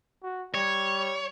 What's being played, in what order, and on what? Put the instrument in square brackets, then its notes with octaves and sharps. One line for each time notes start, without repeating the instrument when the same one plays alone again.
[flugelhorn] F#4
[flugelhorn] G3 [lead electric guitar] C#5